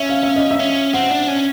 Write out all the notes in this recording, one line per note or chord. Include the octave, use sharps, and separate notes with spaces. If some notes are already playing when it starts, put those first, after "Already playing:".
Already playing: C#4 E5
F5
E5
D#5
E5
C#4
C4 F#5
D4
C#4